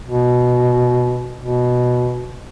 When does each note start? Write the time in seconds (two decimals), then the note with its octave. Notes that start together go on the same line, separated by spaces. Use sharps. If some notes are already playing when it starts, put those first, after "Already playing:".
0.07 B2
1.40 B2